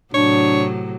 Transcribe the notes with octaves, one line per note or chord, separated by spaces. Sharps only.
A2 C3 F#3 D4 C#5